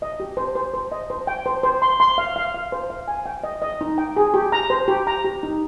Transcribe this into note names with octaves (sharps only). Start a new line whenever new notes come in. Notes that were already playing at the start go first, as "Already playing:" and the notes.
D#5
G4
C5
C5
C5
D#5
C5
G5
C5
C5
C6
C6
F5
F5
F5
C5
F5
G#5
G5
D#5
D#5
D#4
G5
G#4
G4
A#5
C5
G4
A#5
G4
D#4